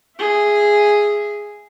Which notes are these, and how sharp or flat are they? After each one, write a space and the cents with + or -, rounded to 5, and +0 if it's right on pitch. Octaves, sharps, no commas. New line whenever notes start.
G#4 +0 E5 +15